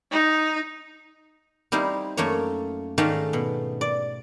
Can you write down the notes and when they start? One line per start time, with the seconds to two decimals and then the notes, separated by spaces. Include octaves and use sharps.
0.11 D#4
1.72 G3 C4 D#4 E4 F5
2.17 F#2 A3 A#3 C#5
2.98 G#2 D#3 A3 C#4 D5 F5
3.33 B2
3.81 D5